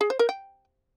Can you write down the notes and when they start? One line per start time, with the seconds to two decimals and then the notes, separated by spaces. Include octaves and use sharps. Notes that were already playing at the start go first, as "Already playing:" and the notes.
0.01 G#4
0.10 C5
0.19 A#4
0.29 G5